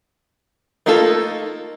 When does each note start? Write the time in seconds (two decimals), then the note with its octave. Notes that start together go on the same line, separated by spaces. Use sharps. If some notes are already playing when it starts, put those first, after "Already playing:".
0.86 A3 A#3 D#4 F4 A4